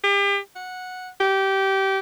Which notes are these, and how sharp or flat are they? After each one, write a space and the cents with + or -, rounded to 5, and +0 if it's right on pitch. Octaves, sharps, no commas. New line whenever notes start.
G4 +35
F#5 -10
G4 -20